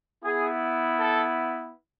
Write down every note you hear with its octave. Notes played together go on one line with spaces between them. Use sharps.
B3 E4 G#4
A4